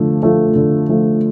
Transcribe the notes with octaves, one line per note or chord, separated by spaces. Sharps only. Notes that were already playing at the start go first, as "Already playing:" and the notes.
Already playing: D3 F3 A3
F3 A3
D3
F3 A3